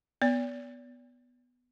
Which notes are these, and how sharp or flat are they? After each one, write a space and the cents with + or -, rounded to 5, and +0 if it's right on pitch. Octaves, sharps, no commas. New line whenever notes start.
B3 +0 D5 -40